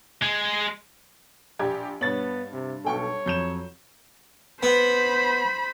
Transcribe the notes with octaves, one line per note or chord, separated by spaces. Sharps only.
G#3
A#1 G4 D5 G#6
G2 B3 C#5 A6 F#7
C3
B1 A4 C#5 G5 C#6
F2 F#3 G6 E7
B3 C5 B5